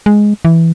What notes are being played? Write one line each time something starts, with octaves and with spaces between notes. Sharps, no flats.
G#3
E3